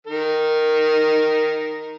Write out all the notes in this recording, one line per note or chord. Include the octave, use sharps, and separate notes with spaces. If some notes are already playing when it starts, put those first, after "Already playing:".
D#3 A#4